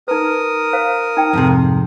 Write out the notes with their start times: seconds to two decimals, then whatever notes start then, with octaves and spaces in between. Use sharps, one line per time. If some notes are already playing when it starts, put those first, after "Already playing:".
0.08 D#4 A#4 B4 D#6
0.73 C5 F5
1.17 D#4 G5
1.33 F2 G#2 C3